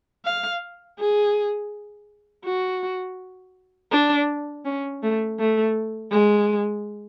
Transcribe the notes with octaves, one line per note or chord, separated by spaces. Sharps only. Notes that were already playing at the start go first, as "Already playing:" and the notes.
F5
G#4
F#4
D4
C#4
A3
A3
G#3